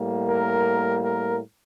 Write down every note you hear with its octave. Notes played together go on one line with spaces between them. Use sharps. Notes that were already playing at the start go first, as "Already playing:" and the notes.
Already playing: A2 G3 A#3
A#4
A#4